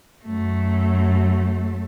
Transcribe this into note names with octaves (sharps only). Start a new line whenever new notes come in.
F#2 A3